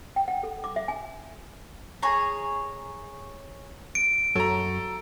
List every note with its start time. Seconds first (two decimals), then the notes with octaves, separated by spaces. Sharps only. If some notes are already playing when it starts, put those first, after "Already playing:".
0.16 G5
0.28 F#5
0.43 A4
0.64 D6
0.76 E5
0.88 G#5
2.03 G#4 C#5 A#5
3.95 D7
4.35 F#2 F#4 A4 C#5 A#5